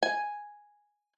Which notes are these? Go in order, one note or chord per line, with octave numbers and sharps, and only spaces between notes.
G#5